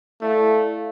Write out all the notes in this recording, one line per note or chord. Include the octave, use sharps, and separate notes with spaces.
A3 E4 A4 D5 F5